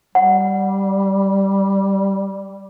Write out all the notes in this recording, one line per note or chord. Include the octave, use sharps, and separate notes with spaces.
G3 F#5